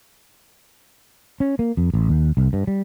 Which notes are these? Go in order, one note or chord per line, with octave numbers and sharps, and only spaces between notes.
C#4
A#3
F2
A1
D#2
C2
G2
G3